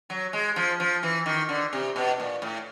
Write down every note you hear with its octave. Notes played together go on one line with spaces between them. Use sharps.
F#3
G#3
F3
F3
E3
D#3
D3
C3
B2
A#2
A2